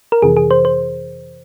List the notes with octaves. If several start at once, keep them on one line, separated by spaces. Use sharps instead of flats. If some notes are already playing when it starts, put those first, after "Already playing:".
A#4
F2 C3 E3 G#4
G#4
C5
C5